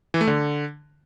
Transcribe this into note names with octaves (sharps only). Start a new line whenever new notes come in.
E3
A3
D3